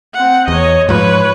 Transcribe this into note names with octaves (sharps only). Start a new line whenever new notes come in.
C4 F#5
E2 C#5 D#5
G#2 F3 B4 C#5